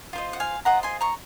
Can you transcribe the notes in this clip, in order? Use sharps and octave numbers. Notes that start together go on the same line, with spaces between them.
F4 C5 D#5
F#5
F5 G#5
F4 C5 D#5 F#5 A#5
G#5 C6
A#5 C#6